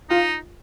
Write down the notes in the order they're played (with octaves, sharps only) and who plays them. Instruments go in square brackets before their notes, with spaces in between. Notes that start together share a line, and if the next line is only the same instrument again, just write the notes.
[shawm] D#4 [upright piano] F4